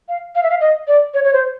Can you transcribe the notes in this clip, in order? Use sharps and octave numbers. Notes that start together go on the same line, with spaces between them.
F5
F5
E5
F5
D#5
D5
C#5
C#5
C5